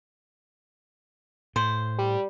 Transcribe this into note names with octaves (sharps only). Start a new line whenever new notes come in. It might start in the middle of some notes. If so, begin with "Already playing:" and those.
A2 C5
G3